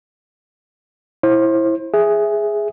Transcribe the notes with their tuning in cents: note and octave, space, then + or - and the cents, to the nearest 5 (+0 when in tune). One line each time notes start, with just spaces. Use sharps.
E4 +0 C5 +30
G#4 +0 E5 +0